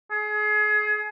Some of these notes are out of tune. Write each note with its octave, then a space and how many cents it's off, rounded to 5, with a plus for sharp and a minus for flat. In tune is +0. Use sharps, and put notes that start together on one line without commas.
G#4 +30